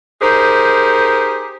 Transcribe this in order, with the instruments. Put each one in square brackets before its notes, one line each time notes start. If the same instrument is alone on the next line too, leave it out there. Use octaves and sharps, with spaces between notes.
[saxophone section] D#4 G4 G#4 A#4 C5